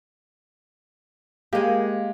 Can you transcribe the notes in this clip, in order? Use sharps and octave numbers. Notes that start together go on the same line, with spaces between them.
G#3 A#3 G4